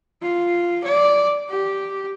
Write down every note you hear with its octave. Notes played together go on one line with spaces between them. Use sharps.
F4
D5
G4